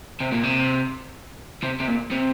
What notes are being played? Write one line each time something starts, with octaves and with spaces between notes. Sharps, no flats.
C3
A#2
C3
C3
C3
A#2
C3